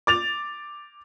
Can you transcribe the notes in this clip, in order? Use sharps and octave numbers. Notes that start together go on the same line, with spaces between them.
D6 A6 F7